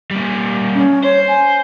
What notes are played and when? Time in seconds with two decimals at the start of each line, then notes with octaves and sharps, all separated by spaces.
0.11 G3 A#3
0.75 C#4
1.04 C5 C#5
1.28 G#5